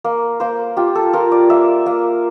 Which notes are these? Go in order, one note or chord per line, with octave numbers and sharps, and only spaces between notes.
A#3
A#3 C5
F4 G4
A4
F4 A#4
D5
A#3 E5
A#3